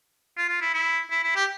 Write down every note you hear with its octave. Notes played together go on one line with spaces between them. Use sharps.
F4
F4
E4
E4
E4
E4
G4